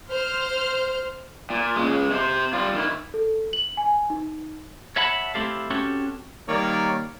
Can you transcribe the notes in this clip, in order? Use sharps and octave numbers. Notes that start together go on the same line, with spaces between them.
C5 F6
A#2
C#2 G#3
C3 C5
G3 F4
D#3 E4
A4
F#7
G#5
D#4
C#5 E5 F#5 A5 B5
A3 C4 E4 G4 A4 F5
C4 C#4 F#4 G4 A4 C#5
D#3 G3 A#3 C#5 D5